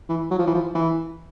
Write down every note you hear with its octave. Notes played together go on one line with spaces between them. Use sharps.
E3
F#3
F3
E3
F3
E3